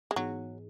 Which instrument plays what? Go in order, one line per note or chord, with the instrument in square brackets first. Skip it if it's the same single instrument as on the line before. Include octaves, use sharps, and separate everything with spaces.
[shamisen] G#3
[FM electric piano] G#2 E3 B3 D#4 G#4 [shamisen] F#3